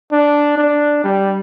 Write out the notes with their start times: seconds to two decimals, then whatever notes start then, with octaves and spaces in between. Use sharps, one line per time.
0.12 D4
0.58 D4
1.04 G3